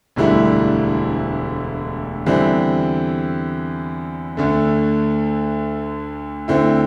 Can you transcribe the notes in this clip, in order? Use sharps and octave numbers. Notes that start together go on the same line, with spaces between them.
E1 D2 D3 G3 E4
E2 D3 G3 C4 E4
D2 D3 A3
D2 D3 C4 E4